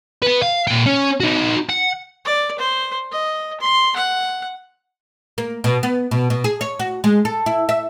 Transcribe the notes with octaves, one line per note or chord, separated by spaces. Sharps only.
B3 B4
F5
A#2 G5
C#4
D#4 F#4
F#5
D5
C5
D#5
C6
F#5
A#3
B2
B3
B2
B2
G#4
C#5
F#4
G#3
A4
E4
E5